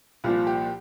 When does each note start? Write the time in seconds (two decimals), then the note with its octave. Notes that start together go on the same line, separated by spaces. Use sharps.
0.24 C2 A#2 F3 F4
0.47 G4